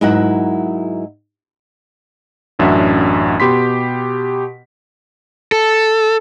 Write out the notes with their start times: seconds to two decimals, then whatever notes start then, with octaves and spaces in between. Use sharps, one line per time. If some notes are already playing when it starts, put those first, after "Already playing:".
0.01 G#2 F#3 E4 A#4 E5 F#5
2.59 A1 F#2 D4 F#4 E5
3.40 B2 G4 B5 C6 B6
5.52 A4